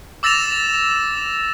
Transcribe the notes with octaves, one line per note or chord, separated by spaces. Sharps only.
D6 E6 A6 A#6 E7 F7